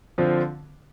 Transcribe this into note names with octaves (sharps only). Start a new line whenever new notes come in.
D3 F3 C4 F4